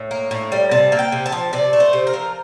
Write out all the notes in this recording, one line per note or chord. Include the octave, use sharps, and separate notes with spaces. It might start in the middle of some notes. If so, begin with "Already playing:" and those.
Already playing: A2
A#3
A2
G3
C3 A5
A#3
G5
C3
A5
F3
C3 D5
A3
C5
C3
A#4
F3